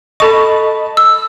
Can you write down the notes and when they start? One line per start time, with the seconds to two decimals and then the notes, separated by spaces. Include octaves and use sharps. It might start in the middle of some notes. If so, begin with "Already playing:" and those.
0.20 A4 D#5 A5 B5 C#6
0.97 E6